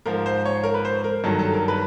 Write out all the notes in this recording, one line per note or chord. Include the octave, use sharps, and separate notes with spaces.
G#2 F3 A#4
C5
C#5
A#4
B4
C5
A#4
G2 D#3 F#3 A4
A4
A#4
B4